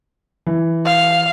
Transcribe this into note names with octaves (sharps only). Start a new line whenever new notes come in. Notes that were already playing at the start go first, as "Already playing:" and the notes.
E3
F5